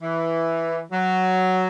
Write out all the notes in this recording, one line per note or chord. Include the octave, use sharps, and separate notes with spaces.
E3
F#3